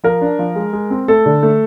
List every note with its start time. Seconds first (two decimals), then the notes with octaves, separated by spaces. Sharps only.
0.04 F3 A#4
0.21 D4
0.39 F3
0.55 G#3
0.73 G#3
0.90 C4
1.08 A3 A4
1.26 D3
1.43 A3